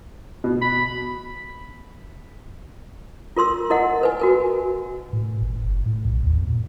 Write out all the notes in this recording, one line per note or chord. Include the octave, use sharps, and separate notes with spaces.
B2
B5
F4 A#4 C6 E6
E4 A#4 D#5 F#5
A#4 B4 G#5
F#4 A#4 G#5
A2
G#1
F#1
A2
B1
D#2
F2
A#2